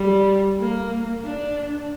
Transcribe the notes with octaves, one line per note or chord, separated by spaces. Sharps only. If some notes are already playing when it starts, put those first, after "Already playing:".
Already playing: G3
A#3
D4